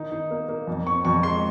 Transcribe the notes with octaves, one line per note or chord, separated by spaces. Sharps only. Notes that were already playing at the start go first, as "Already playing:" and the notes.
Already playing: D#3 D#4
D#4
A#3
A#3
F2
C4 C#6
F2 C#6
G#3 C6